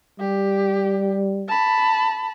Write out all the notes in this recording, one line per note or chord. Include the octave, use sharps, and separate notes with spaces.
G3 G4
A5 B5